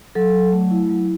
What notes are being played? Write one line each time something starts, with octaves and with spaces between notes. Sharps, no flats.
F#3 A4
F#3
A3
E4
F#3